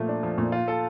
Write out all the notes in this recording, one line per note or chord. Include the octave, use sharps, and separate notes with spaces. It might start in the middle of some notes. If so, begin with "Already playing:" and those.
Already playing: A#2 F3 A3
D4
F3
A#2
F4
A4